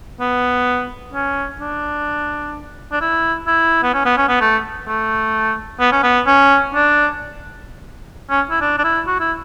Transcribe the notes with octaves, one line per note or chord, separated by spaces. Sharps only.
B3
C#4
D4
D4
E4
E4
B3
C#4
B3
C#4
B3
A3
A3
B3
C#4
B3
C#4
D4
C#4
E4
D4
D4
E4
F#4
E4